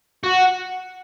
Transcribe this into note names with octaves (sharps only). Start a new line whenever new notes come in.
F#4